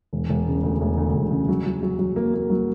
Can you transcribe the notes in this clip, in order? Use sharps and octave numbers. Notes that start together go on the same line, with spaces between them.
E1
E1
C#3
D2
E1
D2
E1
C#3
F#3
F#3
F#3
F#3
A#3
A#3
F#3